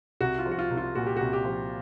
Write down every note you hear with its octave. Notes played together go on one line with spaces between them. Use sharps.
C2 F#4
F4
F3
F#4
F4
C2
F4
A#2 F#4
G4
C2 F#4
G4
F3